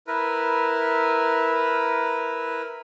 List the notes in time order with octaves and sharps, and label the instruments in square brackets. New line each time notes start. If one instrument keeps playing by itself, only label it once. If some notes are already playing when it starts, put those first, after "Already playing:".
[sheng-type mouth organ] E4 A#4 B4